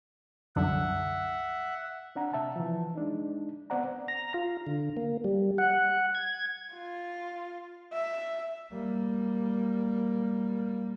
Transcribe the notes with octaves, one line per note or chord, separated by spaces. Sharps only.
C2 F#2 D3 E5 F#5
C4 D4 F#5 A#5
C3 E5 A5
E3 F3
G#3 D4 D#4
B3 C4 C5 D5 F#5 A#5
A#5
F4
D3
A#3
G3
F#5
G#6
F4
E5
G3 A#3